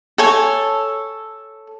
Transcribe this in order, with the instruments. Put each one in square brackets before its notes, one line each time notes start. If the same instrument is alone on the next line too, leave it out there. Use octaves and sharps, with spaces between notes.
[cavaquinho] A4 C#5 G#5